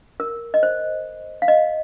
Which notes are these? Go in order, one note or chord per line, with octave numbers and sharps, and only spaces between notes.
A#4
D#5
C5
F5
D#5